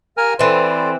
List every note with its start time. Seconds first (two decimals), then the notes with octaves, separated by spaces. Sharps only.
0.17 G4 A#4 F5 G#5 F6
0.39 E3 C4 A4 D5 B5 C6